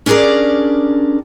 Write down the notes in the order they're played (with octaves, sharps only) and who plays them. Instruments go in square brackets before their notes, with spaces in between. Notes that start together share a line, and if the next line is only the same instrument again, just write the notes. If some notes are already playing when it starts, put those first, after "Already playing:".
[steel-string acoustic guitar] C#4 D4 G4 G#4 A#4 D5